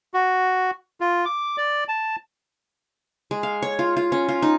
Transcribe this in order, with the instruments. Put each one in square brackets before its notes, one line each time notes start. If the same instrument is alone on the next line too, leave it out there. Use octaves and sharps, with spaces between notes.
[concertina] F#4
F4
D6
D5
A5
[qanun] G#3
F5
C#5
F4
F4
C#4
F4
D#4